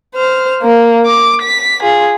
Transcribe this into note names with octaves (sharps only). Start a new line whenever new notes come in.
C5 F6
A#3
D6
B6
F4 G#4